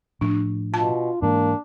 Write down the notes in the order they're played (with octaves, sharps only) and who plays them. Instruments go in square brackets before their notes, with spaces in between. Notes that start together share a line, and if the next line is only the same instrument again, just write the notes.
[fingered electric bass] A2 F3 [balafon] D4
[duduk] B2 [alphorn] F4 [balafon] A5
[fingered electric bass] G#2 E3 [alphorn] A#3 [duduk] D4